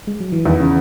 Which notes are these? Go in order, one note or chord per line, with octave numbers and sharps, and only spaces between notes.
G#3
F#3
E3
E2 D#3
C#3